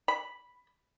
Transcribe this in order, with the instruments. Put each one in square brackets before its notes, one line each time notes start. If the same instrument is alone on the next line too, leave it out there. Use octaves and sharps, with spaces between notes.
[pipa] B5